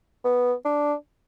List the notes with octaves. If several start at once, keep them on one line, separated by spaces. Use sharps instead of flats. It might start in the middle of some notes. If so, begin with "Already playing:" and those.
B3
D4